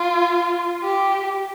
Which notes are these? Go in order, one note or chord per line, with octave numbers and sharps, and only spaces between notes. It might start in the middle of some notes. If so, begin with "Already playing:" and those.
Already playing: F4
G4